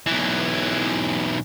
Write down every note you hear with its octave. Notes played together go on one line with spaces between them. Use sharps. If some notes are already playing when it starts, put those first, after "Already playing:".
B1 E3